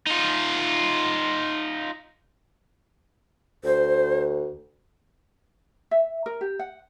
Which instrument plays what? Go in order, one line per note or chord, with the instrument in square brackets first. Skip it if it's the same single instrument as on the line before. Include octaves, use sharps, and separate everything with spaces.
[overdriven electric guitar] D#4 F4
[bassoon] D2 [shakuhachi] C5
[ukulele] E5
A#4
G4
F#5